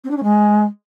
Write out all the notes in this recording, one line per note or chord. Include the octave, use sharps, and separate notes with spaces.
C4
D4
C#4
G#3